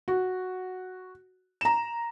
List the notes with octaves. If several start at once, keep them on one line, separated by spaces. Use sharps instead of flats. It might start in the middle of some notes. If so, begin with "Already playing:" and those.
F#4
A#5 E7